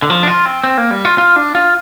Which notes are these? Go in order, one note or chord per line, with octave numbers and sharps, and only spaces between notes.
D3
F3
D4
F4
C4
C4
A#3
G3
F4
F4
D4
F4